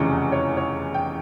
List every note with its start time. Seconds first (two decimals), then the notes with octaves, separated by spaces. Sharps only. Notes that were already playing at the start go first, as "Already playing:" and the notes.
Already playing: F1 E2 C#3 C#6
0.32 C#5
0.57 C#5
0.94 G5